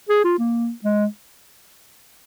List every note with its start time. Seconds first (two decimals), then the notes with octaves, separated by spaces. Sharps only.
0.09 G#4
0.24 F4
0.39 A#3
0.84 G#3